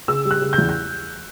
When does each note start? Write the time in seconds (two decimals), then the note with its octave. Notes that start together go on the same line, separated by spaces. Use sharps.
0.08 C#3 E6
0.25 G3
0.31 F#6
0.42 C#3
0.53 G6
0.58 E2
0.69 G6